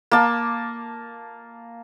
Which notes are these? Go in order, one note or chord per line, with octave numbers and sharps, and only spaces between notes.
A#3 A5